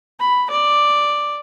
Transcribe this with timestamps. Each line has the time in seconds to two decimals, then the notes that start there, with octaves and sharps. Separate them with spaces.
0.20 B5
0.50 D5